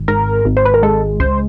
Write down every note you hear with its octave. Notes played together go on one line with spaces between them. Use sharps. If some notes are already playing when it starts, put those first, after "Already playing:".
Already playing: G#1
G#2 A#4
G#1
C5
B4
A#4
G#3 A4
C#2 C5